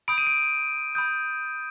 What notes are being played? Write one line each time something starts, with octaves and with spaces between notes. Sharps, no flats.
B5 D#6 G6 D7
D#7
D7
B5 D#6 G6